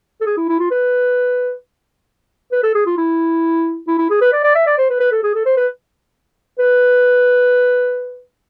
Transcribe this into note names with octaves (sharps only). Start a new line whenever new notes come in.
A4
G#4
E4
E4
F4
B4
B4
A4
G#4
F4
E4
E4
E4
G#4
B4
D5
D5
E5
D5
C5
B4
B4
A4
G#4
A4
C5
B4
B4